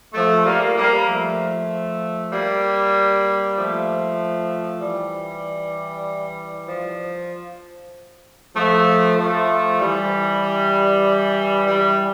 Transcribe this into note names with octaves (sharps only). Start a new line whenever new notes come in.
F3 A3
G3 A#3
G3 A#3
F3 A3
G3 A#3
F3 A3
E3 G3
F3
F3 A3
F3 A3
E3 G3
E3 G3